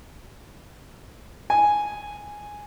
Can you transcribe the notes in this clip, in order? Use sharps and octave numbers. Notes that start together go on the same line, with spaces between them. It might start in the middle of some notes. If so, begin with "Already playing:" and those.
G#5